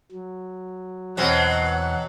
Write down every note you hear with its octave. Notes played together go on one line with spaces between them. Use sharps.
F#3
E2 B2 F#3 C4 F#5